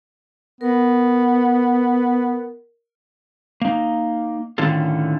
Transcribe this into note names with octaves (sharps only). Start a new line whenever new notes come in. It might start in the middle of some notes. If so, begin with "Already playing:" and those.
B3 A#4
A#3 D#4
A2 D3 D#3 C#4 F4 A4